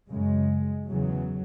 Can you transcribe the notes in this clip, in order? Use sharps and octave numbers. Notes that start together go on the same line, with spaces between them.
F#2 C#3 G#3
E2 C#3 F#3